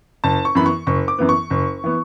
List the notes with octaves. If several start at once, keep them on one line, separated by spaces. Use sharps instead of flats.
F#1 A5
C#6
F#2 E3 B3 B5
C#6
F#1 C#6
D6
F#2 E3 B3
C#6
F#1
E3 B3